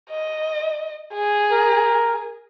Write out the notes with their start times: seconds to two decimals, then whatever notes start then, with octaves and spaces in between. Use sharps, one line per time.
0.11 D#5
1.14 G#4
1.51 A#4